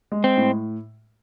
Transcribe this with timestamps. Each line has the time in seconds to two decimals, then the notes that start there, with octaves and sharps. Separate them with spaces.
0.12 G#3
0.24 C4
0.37 A2